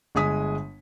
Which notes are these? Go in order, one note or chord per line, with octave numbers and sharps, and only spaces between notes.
G1 G#3 G#5 D#6 B6